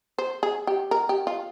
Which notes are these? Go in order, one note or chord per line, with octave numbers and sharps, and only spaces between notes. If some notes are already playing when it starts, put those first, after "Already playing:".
C5
G#4
G4
A#4
G4
F4